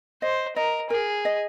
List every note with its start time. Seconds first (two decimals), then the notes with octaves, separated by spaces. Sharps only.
0.22 C5 D#5
0.56 A#4 D#5
0.90 G#4 A#4
1.25 D#5